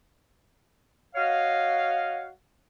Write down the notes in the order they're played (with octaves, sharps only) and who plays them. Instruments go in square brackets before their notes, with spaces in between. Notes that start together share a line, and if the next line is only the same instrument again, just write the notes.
[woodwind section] F#4 C#5 D#5 F5